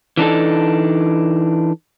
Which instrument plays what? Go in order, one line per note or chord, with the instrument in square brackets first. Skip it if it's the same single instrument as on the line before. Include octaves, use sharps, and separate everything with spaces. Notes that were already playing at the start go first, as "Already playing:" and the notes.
[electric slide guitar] E3 D4 D#4 A4